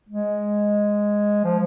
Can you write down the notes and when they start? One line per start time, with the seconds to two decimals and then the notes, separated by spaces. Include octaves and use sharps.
0.09 G#3
1.44 F3